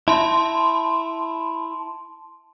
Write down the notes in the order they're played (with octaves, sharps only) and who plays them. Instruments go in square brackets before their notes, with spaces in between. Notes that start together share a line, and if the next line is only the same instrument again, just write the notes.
[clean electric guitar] E4 [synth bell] A5 C6